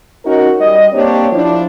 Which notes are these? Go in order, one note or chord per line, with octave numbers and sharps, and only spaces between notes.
C#4 D#4 F#4 A#4
G3 D#5
A#3 C4 D4 G4 C#5
F3 D4 E4